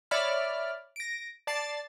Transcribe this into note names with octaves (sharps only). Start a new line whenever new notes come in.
C#5 D5 E5 B5 F6
A#6 D7
D5 A5 A6 C7